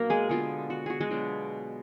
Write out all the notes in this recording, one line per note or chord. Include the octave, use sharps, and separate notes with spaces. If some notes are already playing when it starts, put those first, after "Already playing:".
Already playing: B2 F#3 A#3 D4 A#4
G#3 G#4
D3 G#3 B3 F4
F#4
F#4 G#4
G#3 G#4
B2 F#3 D4 F4